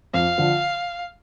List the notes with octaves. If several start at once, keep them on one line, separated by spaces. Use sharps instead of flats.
F2 F5
D3 F3